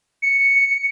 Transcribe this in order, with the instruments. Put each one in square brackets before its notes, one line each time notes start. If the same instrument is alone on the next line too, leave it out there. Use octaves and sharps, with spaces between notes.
[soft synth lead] C#7